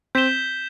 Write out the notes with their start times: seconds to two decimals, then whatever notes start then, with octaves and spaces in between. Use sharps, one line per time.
0.15 C4 G6 B6 E7 G7